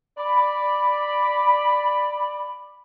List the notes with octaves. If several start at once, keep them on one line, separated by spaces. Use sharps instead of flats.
D5 B5